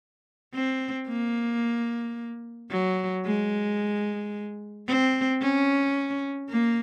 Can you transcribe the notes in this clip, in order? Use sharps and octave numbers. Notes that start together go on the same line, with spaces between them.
C4
A#3
F#3
G#3
C4
C#4
A#3